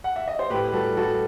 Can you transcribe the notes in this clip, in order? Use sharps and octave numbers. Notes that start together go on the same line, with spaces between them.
F#5
E5
D#5
C5
A2 G4 B4
B4
G3 F#4 A4
G3 F#4 A4